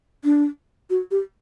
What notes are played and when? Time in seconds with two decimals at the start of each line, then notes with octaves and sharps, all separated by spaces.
0.24 D4
0.90 F#4
1.11 G4